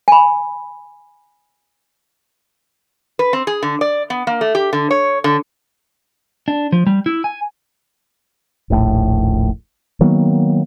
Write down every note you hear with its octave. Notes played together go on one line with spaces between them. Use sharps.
G#5 B5
B4
C4
G#4
D3
D5
B3
A#3
A3
G4
D3
C#5
D3
D4
F3
G3
E4
G#5
D#1 A#1 A2
D#3 F#3 A#3 B3